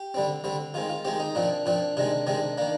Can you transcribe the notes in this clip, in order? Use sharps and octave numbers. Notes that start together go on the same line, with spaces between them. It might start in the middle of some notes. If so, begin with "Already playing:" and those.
Already playing: G4
D3 G3 C4
D3 G3 C4
D#3 G#3 C4 F4
F4
D#3 G#3 C4 G4
D#4
A#2 F3 C4 D4
A#2 F3 C4 D4
C3 D#3 G#3 C4 D4
C3 D#3 G#3 C4 D4
D#3 A#3 D4